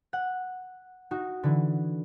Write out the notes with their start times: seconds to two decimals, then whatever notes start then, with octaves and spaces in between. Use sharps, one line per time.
0.13 F#5
1.11 D#4 F#4
1.43 D3 E3